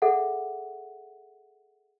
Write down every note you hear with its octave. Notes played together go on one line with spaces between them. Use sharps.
G#4 A4 E5 F#5